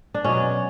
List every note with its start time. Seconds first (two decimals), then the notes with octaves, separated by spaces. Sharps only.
0.14 D4
0.24 B2 F#3 C#4